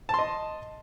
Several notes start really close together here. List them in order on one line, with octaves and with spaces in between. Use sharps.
A5 C6 D#5